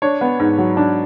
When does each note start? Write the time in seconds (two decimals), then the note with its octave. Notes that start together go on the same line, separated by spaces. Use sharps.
0.02 D4 C#5
0.21 B3
0.39 G#2
0.58 F#3
0.77 D4